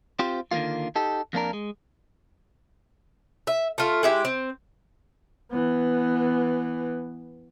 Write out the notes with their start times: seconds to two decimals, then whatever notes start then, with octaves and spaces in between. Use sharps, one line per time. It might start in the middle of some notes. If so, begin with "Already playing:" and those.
0.19 C4 F4 G4 C5
0.51 D3 D#3 F3 A#3 F4
0.96 D#4 G4 A4
1.33 F2 A#3 D4 A#4
1.53 G#3
3.47 E5
3.78 A3 F4
4.03 G#3 E4 G4
4.25 C4
5.50 E3 B3